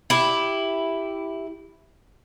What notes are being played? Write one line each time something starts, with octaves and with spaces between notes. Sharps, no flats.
E4 G4